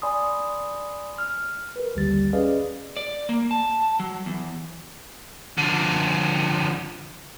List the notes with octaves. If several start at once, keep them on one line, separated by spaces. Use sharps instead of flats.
D5 G#5 B5 C6 D#6
F6
A#4 B4
A1 D#2 D3 G3 G4 A6
C#4 G#4 B4 D5 D#5 F5
D5
A#3
A5
F#3
E2
D3 F3